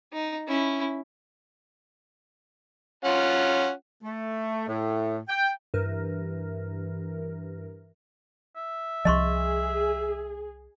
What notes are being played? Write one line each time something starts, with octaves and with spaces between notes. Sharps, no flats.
D#4
C#4 E4
C#4 F4 F#5
A3
A2
G5
G2 E3 A#4
E5
C2 F3 G#4 D#5 C6 C#6